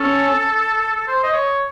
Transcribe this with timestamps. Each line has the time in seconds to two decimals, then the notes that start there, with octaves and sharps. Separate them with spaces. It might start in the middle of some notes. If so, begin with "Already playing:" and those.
Already playing: C#4 A4
0.96 A4
1.08 C5
1.23 D#5
1.33 C#5